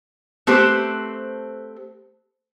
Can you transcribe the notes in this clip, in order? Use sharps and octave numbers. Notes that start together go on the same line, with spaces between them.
A3 C4 G4 B4 C5